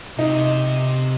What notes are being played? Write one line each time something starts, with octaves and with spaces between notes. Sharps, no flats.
C3 D#4